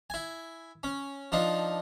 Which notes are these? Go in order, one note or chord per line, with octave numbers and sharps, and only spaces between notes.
E4 G#5
C#4
F3 D4 D#4 F4